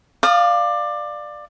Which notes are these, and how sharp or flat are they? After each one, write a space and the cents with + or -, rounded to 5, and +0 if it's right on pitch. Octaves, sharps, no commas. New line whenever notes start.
D5 +20 F5 +0 D#6 -35